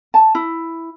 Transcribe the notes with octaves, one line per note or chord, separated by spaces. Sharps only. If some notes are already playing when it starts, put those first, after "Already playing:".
A5
E4